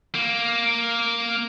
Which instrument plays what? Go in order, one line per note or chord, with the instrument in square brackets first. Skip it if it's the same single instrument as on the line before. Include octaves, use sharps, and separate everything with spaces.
[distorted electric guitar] A#3